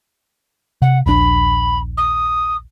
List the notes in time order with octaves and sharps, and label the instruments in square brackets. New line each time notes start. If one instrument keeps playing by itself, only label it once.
[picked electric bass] C3 [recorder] F#5
[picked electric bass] D#1 A#1 D4 [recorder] B5
[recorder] D#6